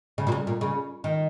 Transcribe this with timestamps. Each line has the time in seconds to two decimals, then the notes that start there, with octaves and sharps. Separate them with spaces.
0.18 C#3
0.27 A#2
0.32 C#3
0.47 A#2
0.61 C#3
1.04 D#3